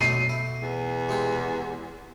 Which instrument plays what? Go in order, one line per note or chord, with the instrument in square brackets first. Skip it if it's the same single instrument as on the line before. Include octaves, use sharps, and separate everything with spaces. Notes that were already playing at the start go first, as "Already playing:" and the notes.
[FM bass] B2 [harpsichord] D3 F#3 D#4 [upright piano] C7 D#7
[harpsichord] E4
[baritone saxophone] E2
[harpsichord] C3 G#3 G5